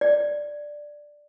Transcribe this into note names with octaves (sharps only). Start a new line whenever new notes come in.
D5